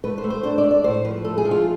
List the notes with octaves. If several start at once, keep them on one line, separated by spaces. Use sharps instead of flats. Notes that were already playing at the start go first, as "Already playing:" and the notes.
A3 B4
C5
A3
C5
D4 C5
D5
A3
D5
A2 C5
F3 B4
A3 A4
G#4
F3
F4